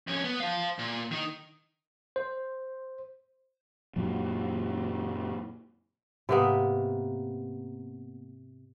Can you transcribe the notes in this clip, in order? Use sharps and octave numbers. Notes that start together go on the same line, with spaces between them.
F2 C#4
B3
C5 F5
A#2
D#3 D#4
C5
F#2 A#2 F#3
G#2 C3 A#3 B3 B4 D#6